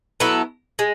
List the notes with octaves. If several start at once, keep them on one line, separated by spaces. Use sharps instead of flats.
F#3 B3 E4 A4
G#3